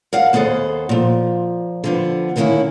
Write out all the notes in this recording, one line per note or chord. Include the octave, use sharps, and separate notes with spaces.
A#4 D5 F5 F#5
D#2 B3 G#4 A4 C5
A#2 F3
D3 F3 B3
D3 D#3 A#3 B3 C#4 E4